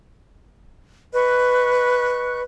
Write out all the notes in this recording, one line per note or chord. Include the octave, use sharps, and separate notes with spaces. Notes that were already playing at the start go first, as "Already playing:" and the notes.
B4 D#5 C#6 F#6